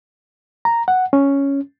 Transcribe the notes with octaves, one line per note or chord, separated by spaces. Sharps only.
A#5
F#5
C#4